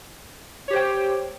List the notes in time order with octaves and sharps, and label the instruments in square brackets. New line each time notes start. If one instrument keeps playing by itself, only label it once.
[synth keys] C#5
G4
C5
G5